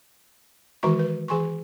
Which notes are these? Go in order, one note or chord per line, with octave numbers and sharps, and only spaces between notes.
D#3 E3 G#3 F#4 A#5 C#6
B4
E3 G#4 G#5 C6 C#6